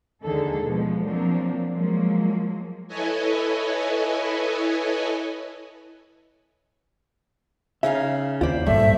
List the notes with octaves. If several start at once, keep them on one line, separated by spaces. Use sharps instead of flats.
D#2 D3 D#3 G#3 G#4 A4
B2 F3 G#3
F3 F#3 A#3 C4 D4
F3 F#3 G#3 A#3
E4 A4 B4 C#5 D#5 G#5
C#3 D#4 E5 F5
D#2 F4 C5 D5 B5
G#1 G2 A#2 A3 E5